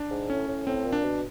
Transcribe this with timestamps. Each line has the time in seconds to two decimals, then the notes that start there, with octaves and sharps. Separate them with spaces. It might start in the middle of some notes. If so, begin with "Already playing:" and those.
Already playing: D4
0.10 G#2
0.29 A2 C#4
0.48 A2
0.67 A2 C4
0.85 A#2
0.92 D4
1.04 B2